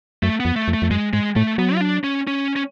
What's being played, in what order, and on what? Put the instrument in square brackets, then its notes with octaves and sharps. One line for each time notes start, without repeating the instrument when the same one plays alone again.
[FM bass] F#2 [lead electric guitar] A3
[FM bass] F2 [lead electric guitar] B3
[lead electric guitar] A3
[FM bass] F2
[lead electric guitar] A3
[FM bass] F2
[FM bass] F#2 [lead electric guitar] G#3
[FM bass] G#2 [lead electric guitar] G#3
[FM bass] A2 [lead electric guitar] A3
[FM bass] F#3 [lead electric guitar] B3
[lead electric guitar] F4
D4
C#4
C#4
C#4